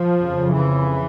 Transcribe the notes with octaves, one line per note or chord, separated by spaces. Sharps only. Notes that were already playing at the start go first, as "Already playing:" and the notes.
Already playing: F3
F2 C#3
E3